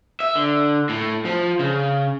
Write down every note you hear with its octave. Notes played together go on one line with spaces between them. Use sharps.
E5
D3
A2
F3
C#3